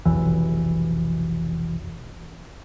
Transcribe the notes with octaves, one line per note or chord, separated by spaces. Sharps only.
F1 B1 E3